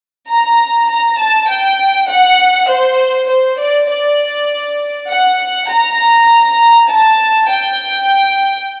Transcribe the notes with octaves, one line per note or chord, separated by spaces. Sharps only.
A#5
A#5
A5
G5
F#5
C5
C5
D5
D5
F#5
A#5
A5
G5